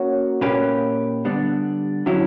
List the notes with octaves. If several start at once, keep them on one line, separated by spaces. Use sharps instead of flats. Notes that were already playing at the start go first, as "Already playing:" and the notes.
Already playing: A#3 C#4 F#4 C#5
A#2 A#3 C#4 G4 B4
D3 G3 B3 D4
D3 F#3 C#4 E4